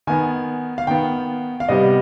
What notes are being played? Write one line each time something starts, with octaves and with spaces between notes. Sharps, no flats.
D#3 B3 G#5
F5
D#3 B3 G5
F5
C3 G3 B3 D#5